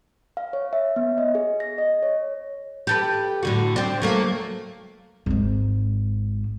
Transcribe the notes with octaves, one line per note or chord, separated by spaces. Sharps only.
F5
C#5
E5
B3
D#5
G#4
A#6
D#5
C#5
G4 A4 B4
A2 D3 F#4
C4 D4
F#3 A3 A#3
G#1 G#2